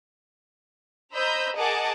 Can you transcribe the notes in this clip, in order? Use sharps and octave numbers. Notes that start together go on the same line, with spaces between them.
C5 D#5 A#5 B5 E6 G6
G#4 A#4 D#5 F#5 A5 D6